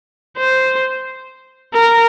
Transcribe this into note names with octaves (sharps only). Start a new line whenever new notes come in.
C5
A#4